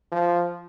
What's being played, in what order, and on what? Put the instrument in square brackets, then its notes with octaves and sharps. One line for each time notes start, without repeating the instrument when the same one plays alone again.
[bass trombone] F3